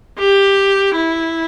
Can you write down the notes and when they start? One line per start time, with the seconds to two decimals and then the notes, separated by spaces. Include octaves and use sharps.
0.19 G4
0.96 E4